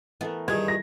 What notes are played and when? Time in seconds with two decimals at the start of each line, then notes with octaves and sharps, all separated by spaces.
0.21 E3 A3 B3 A#4
0.48 G2 D#3 G#4 G#6
0.68 A#6